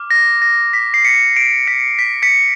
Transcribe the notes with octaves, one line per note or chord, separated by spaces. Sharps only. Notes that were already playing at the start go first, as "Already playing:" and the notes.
Already playing: D6 F6
A#6
A#6
B6
C7
B6 C#7
C7 D7
B6 C#7
B6
B6 C#7